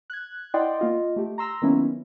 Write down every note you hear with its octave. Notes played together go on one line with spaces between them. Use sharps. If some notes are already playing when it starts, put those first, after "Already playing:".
F#6 G#6
E4 D5 D#5 F#5 G5 C6
A#3 F4 D#5
A3 G4
A#5 C6 E6 A#6
D#3 F#3 A#3 B3 C#4 E4